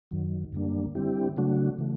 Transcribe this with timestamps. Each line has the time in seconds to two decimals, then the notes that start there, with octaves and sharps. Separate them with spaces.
0.11 F#2 D#3 F#3
0.53 F#2 D3 G3 A#3 D4
0.95 D3 G3 C4 E4 G4
1.37 C#3 F#3 A3 D4 F#4
1.78 C#3 E3 A3